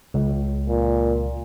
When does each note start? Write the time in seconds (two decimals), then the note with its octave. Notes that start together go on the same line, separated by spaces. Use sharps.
0.14 C#2
0.68 A#2